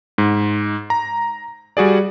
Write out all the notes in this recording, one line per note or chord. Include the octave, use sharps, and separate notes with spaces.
G#2
A#5
G3 F#4 G#4 D5